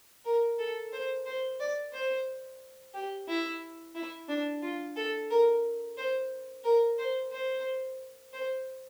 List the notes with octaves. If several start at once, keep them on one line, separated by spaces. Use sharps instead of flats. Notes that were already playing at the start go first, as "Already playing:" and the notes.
A#4
A4
C5
C5
D5
C5
G4
E4
E4
D4
F4
A4
A#4
C5
A#4
C5
C5
C5